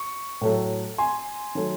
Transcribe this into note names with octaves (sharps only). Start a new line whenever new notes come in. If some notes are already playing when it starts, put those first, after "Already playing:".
Already playing: C#6
A2 F#3 A3
G#5 C6
D#3 F#3 A3